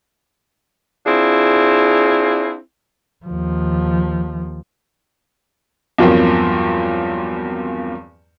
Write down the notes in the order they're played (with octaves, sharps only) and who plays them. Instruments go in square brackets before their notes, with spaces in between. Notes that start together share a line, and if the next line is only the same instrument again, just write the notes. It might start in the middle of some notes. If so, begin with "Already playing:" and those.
[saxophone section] C4 D4 E4 F4 G#4
[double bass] D#2 F3
[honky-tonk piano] E2 G2 F3 F#3 A#3 C4